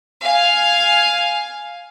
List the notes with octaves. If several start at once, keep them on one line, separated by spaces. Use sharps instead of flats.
F5 G#5